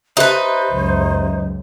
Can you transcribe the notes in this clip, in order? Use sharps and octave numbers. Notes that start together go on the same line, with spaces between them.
D#4 G4 B4 C5 E5
C#2 F#2